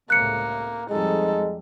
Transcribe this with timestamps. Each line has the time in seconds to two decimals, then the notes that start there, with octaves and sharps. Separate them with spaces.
0.10 C#2 A2 C3 A#3 F#6 C#7
0.90 F2 G3 G#3 D#4 A4